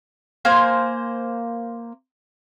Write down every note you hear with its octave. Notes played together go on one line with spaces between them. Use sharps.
A#3 C5 G#5